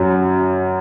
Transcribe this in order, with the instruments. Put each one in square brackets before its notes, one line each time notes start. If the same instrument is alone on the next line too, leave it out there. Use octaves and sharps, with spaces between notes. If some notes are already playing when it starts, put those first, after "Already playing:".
Already playing: [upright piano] F#2